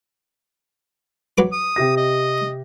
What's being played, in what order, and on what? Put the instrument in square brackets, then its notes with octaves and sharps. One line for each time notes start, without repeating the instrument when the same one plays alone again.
[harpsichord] F#3 B4 D6
[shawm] D#6
[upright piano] C3 G4 A#6
[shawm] D#5